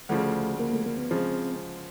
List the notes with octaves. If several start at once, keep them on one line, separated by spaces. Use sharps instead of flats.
D2 C#3 F3 A3
A#3
A3
A#3
B3
C#3 F3 G#3 C4